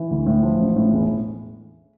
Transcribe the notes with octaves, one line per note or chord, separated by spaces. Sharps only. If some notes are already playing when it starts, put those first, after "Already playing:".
Already playing: E3
D2
A2
F3
A1
A2
E1